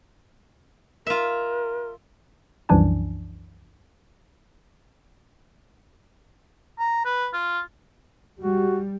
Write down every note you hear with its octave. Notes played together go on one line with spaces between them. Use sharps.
F4 A#4 E5
C2 F#2 E3 F3 D4 G#5
A#5
B4
F4
G3 F#4